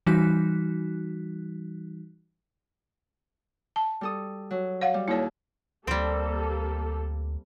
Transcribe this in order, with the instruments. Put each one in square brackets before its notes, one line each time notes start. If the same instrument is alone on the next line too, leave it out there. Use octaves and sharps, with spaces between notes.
[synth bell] E3 G3 D#4 F#4 F#6 B6
[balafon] A5
[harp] G3 A4 D#6
F#3
[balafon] C#5 F5 F#5
[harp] G3
[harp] D#2 G#4 A4 [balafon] E4 C#5
[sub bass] D2 [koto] G3 C4 [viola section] A#3 G4 A4